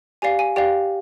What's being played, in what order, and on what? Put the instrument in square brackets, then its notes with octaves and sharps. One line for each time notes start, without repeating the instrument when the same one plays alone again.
[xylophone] G4 D5 F5 G#5
G#5
G4 D5 F5 G5